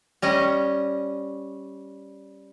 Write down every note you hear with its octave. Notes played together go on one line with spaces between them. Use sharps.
G3 C#4 D#5